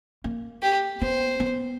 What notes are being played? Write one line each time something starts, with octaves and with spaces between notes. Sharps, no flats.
A#3
G4
B3 C5
B3